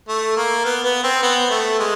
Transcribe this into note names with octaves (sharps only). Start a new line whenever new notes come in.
A3
A#3
B3
B3
C4
B3
A3
G#3